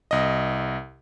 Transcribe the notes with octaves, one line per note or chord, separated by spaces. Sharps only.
C2 D#5